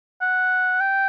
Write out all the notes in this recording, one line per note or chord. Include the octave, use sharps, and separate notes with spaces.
F#5
G5